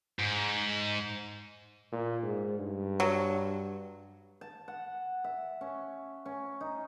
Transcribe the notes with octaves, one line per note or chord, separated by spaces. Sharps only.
G#2
A#2
G#2
G2
F#3
A5
F#5
E5
C#4
C#4
D#4